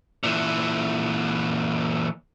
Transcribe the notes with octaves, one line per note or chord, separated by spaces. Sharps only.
A#2 E3